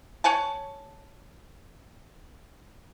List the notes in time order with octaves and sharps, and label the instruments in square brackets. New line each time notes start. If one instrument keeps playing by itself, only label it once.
[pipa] C#5 F#5 G#5 A5